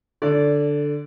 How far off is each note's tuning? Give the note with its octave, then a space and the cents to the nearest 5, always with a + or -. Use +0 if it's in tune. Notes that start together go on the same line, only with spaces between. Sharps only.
D3 +0 D5 -20